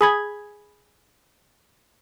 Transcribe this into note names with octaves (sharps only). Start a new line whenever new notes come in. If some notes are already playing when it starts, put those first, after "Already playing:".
G#4 B5 G#6